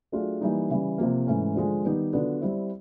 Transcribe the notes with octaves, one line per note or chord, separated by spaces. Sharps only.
F#3 A3 D4 F4 G#4
E3 G3 A#3 D#4
C#3 E3 G3
C3 F3 A#3
G#2 E3 A3 C#4
D3 F3 G#3
D#3 G3 B3 D#4 G4
D3 F#3 B3 D4 F4
G3 C4 E4